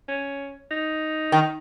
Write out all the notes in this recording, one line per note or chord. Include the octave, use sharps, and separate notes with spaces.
C#4
D#4
D#3